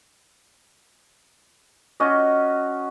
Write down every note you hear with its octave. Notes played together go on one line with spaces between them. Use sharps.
C#4 F#4 D#5